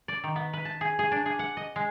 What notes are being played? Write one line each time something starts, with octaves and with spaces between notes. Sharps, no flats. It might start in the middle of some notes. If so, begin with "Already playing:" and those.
D5
D#3
B3
B4
A5
G#4
G#4
D4
G#4
F#5
D#5
G#3